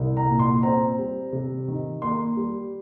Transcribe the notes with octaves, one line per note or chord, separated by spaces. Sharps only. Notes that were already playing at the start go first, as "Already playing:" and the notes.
Already playing: C2
A#5
A#2
C6
C4 A#5
G3
C3
D#3
A#3 C6
G3